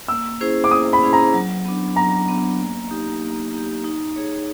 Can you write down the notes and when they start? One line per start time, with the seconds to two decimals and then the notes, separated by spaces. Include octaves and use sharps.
0.08 A#3 E6
0.41 C#4 E4 G#4 C5
0.64 D6
0.71 A#3 D#6
0.93 B5
1.03 C#4 E4 G#4 C5
1.13 A#5
1.34 F#3
1.65 B3 D4
1.96 F#3 A#5
2.28 B3 D4
2.59 A#3
2.91 D#4 G4
3.22 A#3
3.53 D#4 G4
3.84 D#4
4.16 G#4 C#5